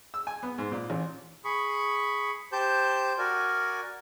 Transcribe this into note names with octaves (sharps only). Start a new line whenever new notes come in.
E6
G#5
B3
G#2
A#2
A1
G#4 B5 C#6
G4 C5 A5 G6
F#4 A#4 D5 G#5